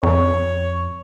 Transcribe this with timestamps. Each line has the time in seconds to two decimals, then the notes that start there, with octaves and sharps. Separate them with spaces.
0.03 F2 C#5